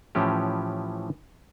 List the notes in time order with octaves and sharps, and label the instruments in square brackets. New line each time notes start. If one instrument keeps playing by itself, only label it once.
[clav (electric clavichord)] A2 E3 F3 C#4 G4